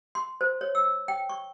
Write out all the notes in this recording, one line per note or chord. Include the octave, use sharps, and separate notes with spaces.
C6
C5
C#5
E6
G5
C#6